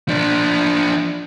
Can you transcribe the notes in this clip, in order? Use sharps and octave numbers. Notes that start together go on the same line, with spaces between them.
F3 D4